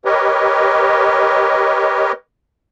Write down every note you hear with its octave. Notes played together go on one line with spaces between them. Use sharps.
G4 A#4 B4 C#5 D#5